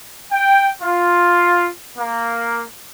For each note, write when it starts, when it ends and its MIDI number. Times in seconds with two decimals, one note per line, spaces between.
0.32 0.70 79
0.82 1.67 65
1.97 2.61 58